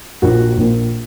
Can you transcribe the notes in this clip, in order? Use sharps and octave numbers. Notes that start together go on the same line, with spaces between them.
A#1 A#2 A#3 F#4
A#1 A#2 A#3